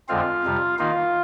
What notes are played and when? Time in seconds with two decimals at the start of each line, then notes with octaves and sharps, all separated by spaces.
0.09 F2 D3 G#3 C4 F4 F5
0.44 F2 C3 G3
0.79 D#3 A#3 D#4 F4 F5